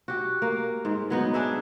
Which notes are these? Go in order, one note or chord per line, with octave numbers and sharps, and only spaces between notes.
F#4 G4
A#3
G#2
F#3 B3 D#4
D4 G#4 E5